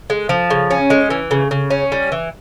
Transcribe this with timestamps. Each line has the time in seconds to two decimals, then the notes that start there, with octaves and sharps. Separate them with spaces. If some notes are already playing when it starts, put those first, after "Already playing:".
0.10 G#3
0.29 F3
0.50 C#3
0.71 C#4
0.90 G#3
1.10 E3
1.31 C#3
1.51 C#3
1.70 C#4
1.92 G3
2.12 E3